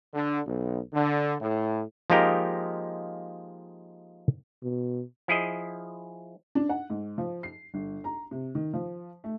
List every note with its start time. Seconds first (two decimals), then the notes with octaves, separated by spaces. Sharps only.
0.14 D3
0.46 B1
0.94 D3
1.41 A2
2.10 F3 G#3 A#3 D#4 G4 A#4
4.63 B2
5.28 F3 E4 G#4 D#5
6.55 D4
6.69 F#5
6.90 G#2
7.18 F3
7.43 C7
7.74 G1
8.04 A#5
8.31 C3
8.55 D#3
8.74 F3
9.24 A3